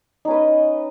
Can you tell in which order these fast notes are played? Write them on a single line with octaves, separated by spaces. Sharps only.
D#4 C#4 B4 D#5